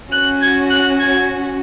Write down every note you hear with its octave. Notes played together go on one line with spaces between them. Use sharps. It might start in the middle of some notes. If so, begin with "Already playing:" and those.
C#4 F#4 F#6
G#6
F#6
G#6